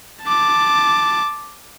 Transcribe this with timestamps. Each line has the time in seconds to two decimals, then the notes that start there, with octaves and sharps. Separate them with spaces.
0.23 A5 D6